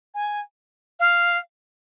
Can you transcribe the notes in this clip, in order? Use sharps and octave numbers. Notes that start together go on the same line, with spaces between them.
G#5
F5